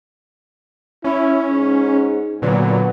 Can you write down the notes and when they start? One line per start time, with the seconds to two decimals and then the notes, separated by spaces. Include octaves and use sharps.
1.04 C#4 E4
1.49 G#2
2.42 A#2 D3 F#3 B3